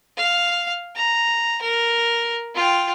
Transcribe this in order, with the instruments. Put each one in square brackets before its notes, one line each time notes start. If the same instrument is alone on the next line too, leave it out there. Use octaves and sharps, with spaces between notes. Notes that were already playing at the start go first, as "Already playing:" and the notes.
[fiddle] F5
A#5
A#4
F4 G5